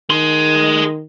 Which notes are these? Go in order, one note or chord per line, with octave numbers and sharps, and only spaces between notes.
D#3 G#4 C6